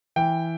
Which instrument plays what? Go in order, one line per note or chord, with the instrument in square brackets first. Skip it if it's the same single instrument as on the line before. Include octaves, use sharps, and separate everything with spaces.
[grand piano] E3 G5